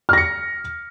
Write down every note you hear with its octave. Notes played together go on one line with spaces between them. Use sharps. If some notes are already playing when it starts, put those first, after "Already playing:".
F6 A#6 C#7